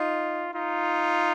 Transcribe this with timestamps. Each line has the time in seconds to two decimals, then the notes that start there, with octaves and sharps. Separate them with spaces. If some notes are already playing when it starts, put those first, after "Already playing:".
Already playing: D#4 F4
0.54 D#4 F4